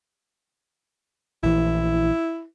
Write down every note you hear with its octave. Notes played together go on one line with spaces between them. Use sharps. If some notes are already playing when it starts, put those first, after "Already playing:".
A#1 E3 E4